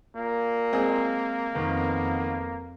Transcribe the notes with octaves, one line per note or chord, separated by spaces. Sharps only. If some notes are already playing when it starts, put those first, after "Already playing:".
A#2 A#3
G#3 C4 G#4
F2 D#3 B3